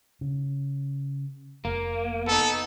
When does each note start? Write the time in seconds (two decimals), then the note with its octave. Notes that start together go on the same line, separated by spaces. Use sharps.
0.21 C#3
1.65 F1 A#3
2.27 B3 D#4 A4